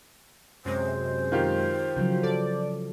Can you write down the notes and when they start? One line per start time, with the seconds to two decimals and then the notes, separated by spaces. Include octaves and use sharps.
0.65 F#2 C3 G#3 C5
1.32 D#3 F4 G4
1.97 C#3 F3 F#3
2.23 A4 D5